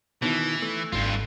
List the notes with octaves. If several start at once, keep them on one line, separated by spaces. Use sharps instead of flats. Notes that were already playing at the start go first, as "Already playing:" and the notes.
B2 D#3 E3 E4
A3
G#1 G2 F4